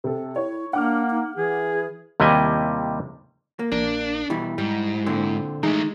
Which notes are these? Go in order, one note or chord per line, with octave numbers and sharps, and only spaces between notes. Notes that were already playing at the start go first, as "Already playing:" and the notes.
C3 A4
E4 C#5
A#3 D4 F#5 D6 F6
D#4
E3 G#4
D#2 C3 G3 E4 D#5 G#5
A#3
A#1 A#3 D4
B2 E3 G3 E4
G#2 G3
A#2 D3 C4
E3 G#3 A3 D#4 G#4